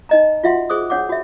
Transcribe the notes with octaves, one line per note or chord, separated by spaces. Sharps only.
D#4 D#5 A#5
F4 F#4 E5 F#5 C6
G#4 C5 D6 D#6
D4 C#5 F#5 D6
F#4 E5